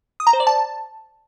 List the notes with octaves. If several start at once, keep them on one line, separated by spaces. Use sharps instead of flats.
D#6
A#5
C5
D5
A5